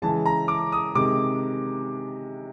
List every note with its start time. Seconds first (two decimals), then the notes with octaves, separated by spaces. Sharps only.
0.02 C#3 E3 G#3 A5
0.26 A#5
0.48 D6
0.72 D#6
0.95 C3 D#3 G#3 D6